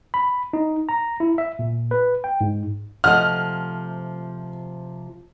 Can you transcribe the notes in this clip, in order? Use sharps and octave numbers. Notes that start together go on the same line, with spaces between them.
B5
D#4
A#5
E4
E5
A#2
B4
G5
G#2
C3 F3 A3 D#5 F#5 F6